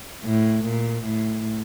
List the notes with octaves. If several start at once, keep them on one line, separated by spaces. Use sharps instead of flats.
A2
A#2
A2